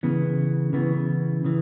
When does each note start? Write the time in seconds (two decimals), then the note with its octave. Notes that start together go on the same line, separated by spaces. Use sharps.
0.03 C#3 E3 B3
0.73 C#3 E3 B3
1.45 C#3 E3